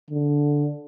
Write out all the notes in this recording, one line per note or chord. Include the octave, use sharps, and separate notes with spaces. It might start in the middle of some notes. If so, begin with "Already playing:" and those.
D3